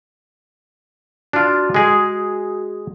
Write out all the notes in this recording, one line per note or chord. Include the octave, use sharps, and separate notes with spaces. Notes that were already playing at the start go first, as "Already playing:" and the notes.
D4 F4 F#4
G#3 G#4